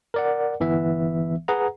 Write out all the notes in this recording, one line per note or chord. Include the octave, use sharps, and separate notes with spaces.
A#4 D5 F#5
G1 E3 B3 E5
G#4 B4 F#5 A#5